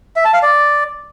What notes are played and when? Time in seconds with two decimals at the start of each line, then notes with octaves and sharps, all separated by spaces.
0.16 E5
0.25 A5
0.34 F5
0.42 D5